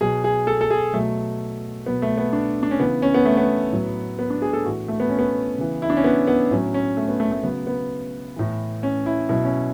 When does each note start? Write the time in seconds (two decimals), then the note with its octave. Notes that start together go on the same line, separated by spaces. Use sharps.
0.01 B2 F#3 G#4
0.24 G#4
0.47 A4
0.61 A4
0.70 G#4
0.93 B2 F#3 A3
1.86 B2 F#3 B3
2.02 A3
2.18 B3
2.33 D4
2.63 D4
2.71 C#4
2.80 C#3 E3 B3
3.02 C#4
3.14 B3
3.26 A3
3.37 B3
3.72 A2 F#3
4.19 B3
4.30 D4
4.42 G#4
4.53 A4
4.65 A2 E3 F#4
4.88 A3
5.00 B3
5.10 C#4
5.19 B3
5.58 C#3 E3
5.82 E4
5.90 D4
5.97 C#4
6.04 B3
6.27 B3
6.51 A2 F#3 C#4
6.74 C#4
6.97 A3
7.09 B3
7.20 A3
7.32 A3
7.43 C#3 F#3 B3
7.67 B3
8.36 A2 E3
8.83 C#4
9.06 E4
9.29 B2 F#3 E4
9.44 C#4